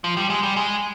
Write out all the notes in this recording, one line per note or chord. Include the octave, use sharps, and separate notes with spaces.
F3
G3
G#3
G3
G#3